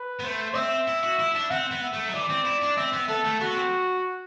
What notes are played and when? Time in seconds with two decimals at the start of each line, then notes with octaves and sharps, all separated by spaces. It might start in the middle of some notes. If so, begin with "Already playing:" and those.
Already playing: B4
0.20 B3
0.24 A3 C5
0.55 C4 E5
0.88 E4
1.03 F#4
1.19 E4
1.35 D4
1.50 C4 F#5
1.71 B3
1.83 E5
1.94 A3
2.07 F#3
2.14 E3 D5
2.30 C4
2.45 E4
2.62 D4
2.77 C4 E5
2.93 B3
3.09 B3 A4
3.25 A3
3.41 B3 F#4
3.56 C4